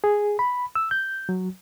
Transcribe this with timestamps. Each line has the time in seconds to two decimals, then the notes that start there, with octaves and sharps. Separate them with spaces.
0.04 G#4
0.39 B5
0.75 E6
0.91 G6
1.29 F#3